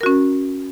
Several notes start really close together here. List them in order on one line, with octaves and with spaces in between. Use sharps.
A#4 F#4 C#4